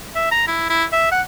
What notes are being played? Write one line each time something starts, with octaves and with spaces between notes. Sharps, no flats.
E5
A#5
E4
E4
E5
F#5